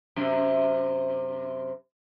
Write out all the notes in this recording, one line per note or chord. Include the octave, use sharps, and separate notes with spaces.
F#2 C3